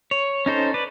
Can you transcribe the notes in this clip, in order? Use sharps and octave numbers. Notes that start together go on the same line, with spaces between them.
C#5
C#4 D#4 A4 C5
B4 D5